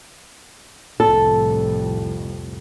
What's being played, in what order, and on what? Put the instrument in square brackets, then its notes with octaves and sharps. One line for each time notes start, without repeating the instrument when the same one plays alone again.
[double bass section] C2 F2 A2 [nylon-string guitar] A4